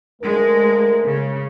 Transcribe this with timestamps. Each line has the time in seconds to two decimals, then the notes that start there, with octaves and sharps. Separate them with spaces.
0.22 D2 G#3 A3 A#4
1.03 C#3